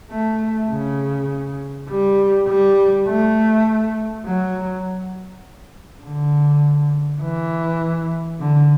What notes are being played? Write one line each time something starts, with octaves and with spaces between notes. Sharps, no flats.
A3
C#3
G3
G3
A3
F#3
D3
E3
D3